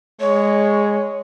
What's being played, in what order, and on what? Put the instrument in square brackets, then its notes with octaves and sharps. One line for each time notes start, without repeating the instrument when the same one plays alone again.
[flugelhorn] G#3 [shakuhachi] C#5